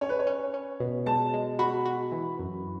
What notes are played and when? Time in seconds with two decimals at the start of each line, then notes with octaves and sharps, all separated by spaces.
0.01 C#4 C#5
0.09 B4
0.19 C#5
0.27 C#4
0.54 C#4
0.80 B2
1.06 G#3 A5
1.34 G#3
1.59 F#4 B5
1.85 F#4
2.12 E3
2.39 F#2